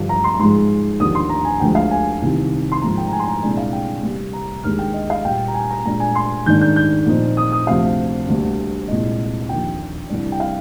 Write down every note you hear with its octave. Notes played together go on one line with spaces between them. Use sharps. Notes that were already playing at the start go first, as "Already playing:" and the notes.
Already playing: G2 D3 F3
A#5
C6
G#2 F3 G#3 C6
D#2 D3 F3 D#6
C6
A#5
G#5
D2 D3 F3 G#3 G5
F5
G#5
C2 C3 D#3
C6
G#2 F3 A#3 A#5
G5
A#5
G#5
C6
A#5
C2 A#2 G#3 D4 G#5
F5
G5
C3 G3 A#3
A#5
D#2 D3 G#3 F6
G5
D#5
F5
A#2 G3 A#3 G5
A#5
G#5
A#5
A#2 G#3 D4 A#5
G#5
C6
G#2 D#3 A#3 D4 G6
G6
G6
A#2 F3 C4 D#4
D#6
D#6
D2 C3 F3 C4 F5
D2 D3 G3 A#3
C2 A#2 G#3 D#5
D#2 D3 F3 G5
C2 C3 G3 D4
G5
F5